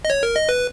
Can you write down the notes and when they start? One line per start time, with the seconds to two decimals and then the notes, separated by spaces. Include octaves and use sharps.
0.05 D#5
0.10 C#5
0.23 A#4
0.36 D#5
0.49 B4